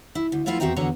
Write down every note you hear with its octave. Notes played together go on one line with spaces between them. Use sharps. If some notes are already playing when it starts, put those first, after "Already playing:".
E4
D2
F3 A3 B3 E4 F4
E2 C4 F#4 E5 G5 A#5
E2 D3 F#4 C#5 A#5